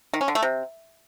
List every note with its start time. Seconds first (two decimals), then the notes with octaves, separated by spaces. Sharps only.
0.14 D#3
0.21 C#4
0.28 D3
0.35 A3
0.42 C3